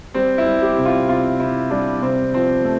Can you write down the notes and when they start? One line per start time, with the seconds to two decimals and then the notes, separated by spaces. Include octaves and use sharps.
0.14 G3 C4
0.38 E4
0.45 G3
0.62 G4
0.77 C3
0.85 F4
1.08 C3 F4
1.39 C3 E4
1.70 G3 D4
2.02 C3 C4
2.34 F3 C4
2.64 A3